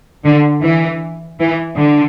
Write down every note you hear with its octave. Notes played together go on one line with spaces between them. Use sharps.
D3
E3
E3
D3